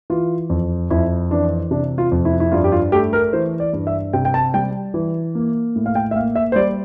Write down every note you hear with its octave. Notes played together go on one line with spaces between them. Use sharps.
E3 F4
F2
F2 E4
E3 D4
C3 D4
F4
F2
E4
E4
G2 F4
G4
F4
A3 G4
A#4
E3 C5
D5
G2
E5
C3 G5
G5
A5
G3 G5
E3
A#3
A2
F5
G5
E5
A#3 F5
E5
C5
G3 D5